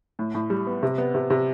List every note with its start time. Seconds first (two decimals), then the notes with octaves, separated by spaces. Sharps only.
0.19 A2
0.35 A2
0.50 G3
0.67 B3
0.83 C3
0.98 B3
1.15 C3
1.30 C3